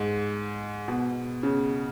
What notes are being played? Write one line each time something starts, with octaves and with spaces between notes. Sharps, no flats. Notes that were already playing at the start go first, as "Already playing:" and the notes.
Already playing: G#2
B2
C#3